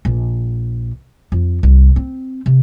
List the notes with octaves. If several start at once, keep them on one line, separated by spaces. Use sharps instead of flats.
A#1
F2
C2
C4
C3